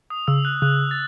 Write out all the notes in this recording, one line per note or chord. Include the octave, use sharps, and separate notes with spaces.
D#6
C#3 E6
F#6
C#3 F#6
A6